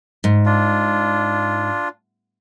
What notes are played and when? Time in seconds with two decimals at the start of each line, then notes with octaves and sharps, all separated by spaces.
0.24 G#2
0.46 D4 F4